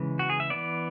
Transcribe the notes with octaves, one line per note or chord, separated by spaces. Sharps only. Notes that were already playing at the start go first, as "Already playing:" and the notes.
Already playing: C#3 E3 G#3
F#4
G#4
E5
E3 B3 D5